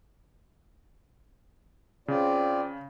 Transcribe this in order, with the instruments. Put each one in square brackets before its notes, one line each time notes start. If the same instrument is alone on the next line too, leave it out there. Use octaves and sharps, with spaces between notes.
[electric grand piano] C#3 [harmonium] C4 F4 D5